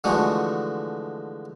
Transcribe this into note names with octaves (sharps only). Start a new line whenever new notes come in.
D3 E3 F3 G#3 A3 F#4